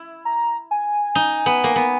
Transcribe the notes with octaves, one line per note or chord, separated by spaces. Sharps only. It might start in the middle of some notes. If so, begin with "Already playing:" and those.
Already playing: E4
A#5
G#5
D#4
B3
A#3
B3